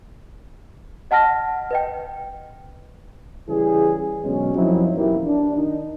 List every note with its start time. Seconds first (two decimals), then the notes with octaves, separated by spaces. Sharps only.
1.11 D#5 F#5 A5 F6 A#6
1.71 B4 D#5 G5
3.49 C#3 E3 G3 E4 G#4
4.24 D2 B2 F#3 G#3 C#4
4.55 F#2 F3 F#3 C4 D#4 E4
4.96 B1 F#2 E3 A#3 E4 G4
5.26 D4
5.56 D#3 D#4